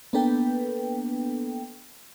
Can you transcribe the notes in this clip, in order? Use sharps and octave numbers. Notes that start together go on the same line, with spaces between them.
A#3 B3 D4 A4 B4 G5